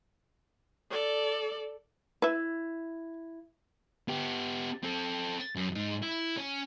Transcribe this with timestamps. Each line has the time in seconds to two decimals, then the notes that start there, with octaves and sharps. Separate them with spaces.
0.91 A4 D5
2.22 E4 B4 E5
4.08 B3 G4
4.83 C4 A4
5.55 F#2
5.75 G#2 D#4
6.02 E4
6.37 C#4